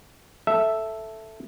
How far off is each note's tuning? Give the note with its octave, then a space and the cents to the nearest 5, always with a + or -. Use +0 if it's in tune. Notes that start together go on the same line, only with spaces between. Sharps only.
A4 +0 E5 +0